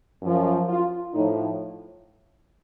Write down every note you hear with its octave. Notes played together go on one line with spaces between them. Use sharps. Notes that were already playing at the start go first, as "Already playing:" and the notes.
F#2 F3
F4
A2 F3 D#4